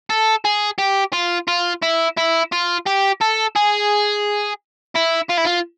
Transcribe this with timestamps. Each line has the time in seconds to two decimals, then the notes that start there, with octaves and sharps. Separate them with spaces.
0.10 A4
0.45 G#4
0.78 G4
1.13 F4
1.48 F4
1.82 E4
2.17 E4
2.52 F4
2.86 G4
3.21 A4
3.56 G#4
4.95 E4
5.29 F4
5.37 E4
5.45 F4